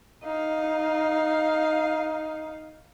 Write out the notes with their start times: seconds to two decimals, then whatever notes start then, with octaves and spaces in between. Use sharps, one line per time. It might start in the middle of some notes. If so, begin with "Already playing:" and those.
0.24 D#4 F5